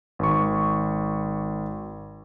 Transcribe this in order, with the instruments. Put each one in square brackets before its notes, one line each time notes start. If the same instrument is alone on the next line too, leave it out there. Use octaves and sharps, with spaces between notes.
[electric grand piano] G#1 C#6